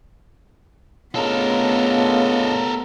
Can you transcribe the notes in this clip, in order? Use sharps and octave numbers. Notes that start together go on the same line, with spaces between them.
C#3 A3 B3 D4 F4 A4 A#4 D#5